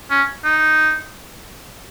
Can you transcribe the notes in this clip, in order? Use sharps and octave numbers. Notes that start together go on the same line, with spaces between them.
C#4
D#4